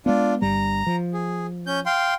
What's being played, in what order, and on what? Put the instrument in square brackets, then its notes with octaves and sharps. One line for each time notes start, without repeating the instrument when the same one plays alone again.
[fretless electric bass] G#3 B3 [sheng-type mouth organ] D4 F4
[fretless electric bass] G1 G2 G3 [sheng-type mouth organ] A#5
[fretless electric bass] F3
[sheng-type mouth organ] G#4
C#4 G6
F5 G5 C6